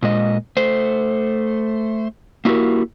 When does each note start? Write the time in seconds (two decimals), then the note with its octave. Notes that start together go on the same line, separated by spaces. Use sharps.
0.03 A#2 G#3 D#5
0.57 A3 C5
2.45 A#3 E4 F#4 G4 A#4